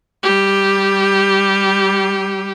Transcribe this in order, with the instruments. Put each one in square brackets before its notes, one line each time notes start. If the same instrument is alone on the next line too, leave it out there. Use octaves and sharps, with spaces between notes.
[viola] G3 G4